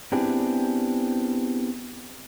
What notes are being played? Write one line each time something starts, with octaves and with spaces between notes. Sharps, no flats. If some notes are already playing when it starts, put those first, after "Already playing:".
B3 C4 D4 E4 G4 G#4